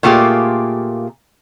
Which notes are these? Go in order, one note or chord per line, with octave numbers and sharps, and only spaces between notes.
A#2 A3 A#3 F4 G4 G#4